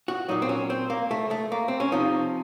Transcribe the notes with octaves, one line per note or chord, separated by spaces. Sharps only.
F#4
A#2 F#3 D#4
C4
C#4
C4
A#3
A3
A3
A#3
C4
C#4
C3 F3 D#4